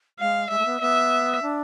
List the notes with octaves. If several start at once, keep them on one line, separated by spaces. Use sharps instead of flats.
G#3 F5
G#3 E5
A3
B3
B3 E5
D4